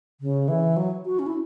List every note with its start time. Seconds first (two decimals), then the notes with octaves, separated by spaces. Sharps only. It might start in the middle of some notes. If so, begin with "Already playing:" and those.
0.21 C#3
0.48 E3
0.77 F#3
1.05 F#4
1.19 C#4
1.27 E4